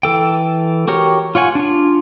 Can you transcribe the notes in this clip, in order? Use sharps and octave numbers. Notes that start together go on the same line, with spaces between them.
E3 A4 G5
F#4 G4 A#4 C#5
F4 C#5 F#5 G#5
D4 F4